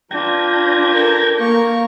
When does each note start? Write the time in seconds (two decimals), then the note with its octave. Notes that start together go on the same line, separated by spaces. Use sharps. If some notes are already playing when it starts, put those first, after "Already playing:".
0.11 D4 F4 B4 G5 A#5 G#6
0.90 A4 A#4
1.40 A#3 A#4 C#6